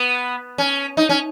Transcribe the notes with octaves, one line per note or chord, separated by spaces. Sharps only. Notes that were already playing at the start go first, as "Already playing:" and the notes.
Already playing: B3
C#4
D#4
C#4